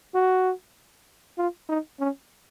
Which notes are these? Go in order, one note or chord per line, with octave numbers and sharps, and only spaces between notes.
F#4
F4
D#4
C#4